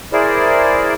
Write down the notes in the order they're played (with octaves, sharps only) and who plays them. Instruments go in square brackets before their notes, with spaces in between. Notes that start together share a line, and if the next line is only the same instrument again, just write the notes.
[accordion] E4 G#4 A#4 C5 D5